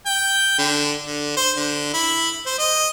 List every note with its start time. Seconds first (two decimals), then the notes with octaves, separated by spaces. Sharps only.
0.06 G5
0.58 D3
1.04 D3
1.37 C5
1.56 D3
1.93 E4
2.46 C5
2.59 D#5